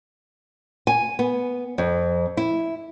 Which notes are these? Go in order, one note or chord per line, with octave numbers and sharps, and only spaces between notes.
G#5
B3
F2
E4